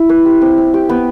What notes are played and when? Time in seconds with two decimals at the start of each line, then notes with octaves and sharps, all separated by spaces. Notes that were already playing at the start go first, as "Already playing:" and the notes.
Already playing: E4
0.09 B4
0.25 G4
0.42 C4
0.58 C4
0.74 G4
0.89 B3